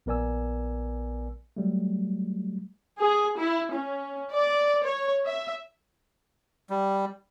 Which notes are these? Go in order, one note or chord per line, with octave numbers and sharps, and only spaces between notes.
A#1 B3 A#4 D5 G#5 E6
F#3 G3 A3
G#4
E4
C#4
D5
C#5
E5
G3